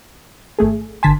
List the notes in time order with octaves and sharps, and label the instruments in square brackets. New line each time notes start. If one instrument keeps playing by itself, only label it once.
[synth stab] G#1 A3 G#4
[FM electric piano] G1 D3 C6 [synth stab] G#5 A5 B6